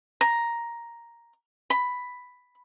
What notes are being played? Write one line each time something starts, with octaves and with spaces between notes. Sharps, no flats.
A#5
B5